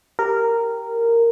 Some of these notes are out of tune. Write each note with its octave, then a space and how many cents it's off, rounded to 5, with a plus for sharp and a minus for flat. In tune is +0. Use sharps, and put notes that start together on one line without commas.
G4 +0 A#4 -10